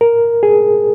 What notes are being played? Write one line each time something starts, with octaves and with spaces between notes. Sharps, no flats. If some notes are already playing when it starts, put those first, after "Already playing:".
A#4
G#4